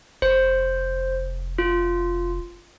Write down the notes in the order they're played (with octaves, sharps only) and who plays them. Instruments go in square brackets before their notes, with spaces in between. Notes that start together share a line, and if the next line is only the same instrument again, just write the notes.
[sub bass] F1 [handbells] C5
[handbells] F4